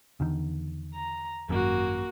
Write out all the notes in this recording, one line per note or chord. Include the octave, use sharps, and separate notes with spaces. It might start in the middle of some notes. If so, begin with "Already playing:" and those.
E2 D3 D#3
A#5
G#1 F#2 A#3 F#4